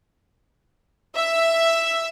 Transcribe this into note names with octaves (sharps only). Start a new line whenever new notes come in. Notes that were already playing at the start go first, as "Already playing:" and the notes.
E5